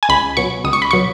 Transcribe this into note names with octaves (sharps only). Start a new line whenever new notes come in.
G#5
C#2 B5
B2 F#3 C#6
C#2 D#6
C#6
B5
B2 F#3 C#6